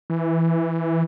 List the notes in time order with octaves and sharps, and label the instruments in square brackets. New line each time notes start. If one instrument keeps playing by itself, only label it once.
[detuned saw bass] E3